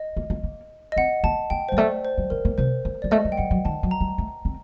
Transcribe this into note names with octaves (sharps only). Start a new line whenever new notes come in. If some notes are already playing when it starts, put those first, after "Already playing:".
Already playing: D#5
A#3
A#3
A#3
D#5
C4 F#5
A#3 A5
A#3 G5
G3 C5
A3 D5
C5
G3
A3 A#4
A#3
C3 C5
A#3
G3 D5
A3 D#5
G3
G5
G3 F#5
F#3
D#3 A5
F#3
A#5
G3
A3
C4